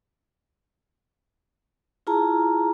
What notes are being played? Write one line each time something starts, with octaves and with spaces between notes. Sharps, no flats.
E4 F4 G#4 A5 A#5